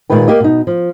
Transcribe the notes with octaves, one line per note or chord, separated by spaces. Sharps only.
A#2 D#3 G#3 B4 G5
A#3 G4 D#5
B2 D#4
F3